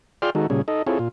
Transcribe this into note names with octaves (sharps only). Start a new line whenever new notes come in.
F4 G#4 D5 G5 C6 F6
D#3 G#3 D#4 F#4 A4
A#2 C#3 G3 C#4 G#4
D#4 A4 D#5
C4 E4 F4 G#4 A4 C#5
A#2 F4